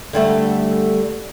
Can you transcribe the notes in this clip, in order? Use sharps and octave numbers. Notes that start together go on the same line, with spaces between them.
D3 G3 A3